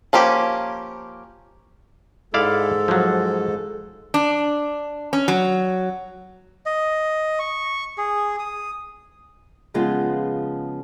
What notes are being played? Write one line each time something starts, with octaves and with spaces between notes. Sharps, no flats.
F3 A#3 C#4 G4
G#2 G#3 E4 A4 D5 F5
F3 F#3
D4
C#4
F#3
D#5
C#6
G#4
D#6
C#3 F3 G#3 B3 F4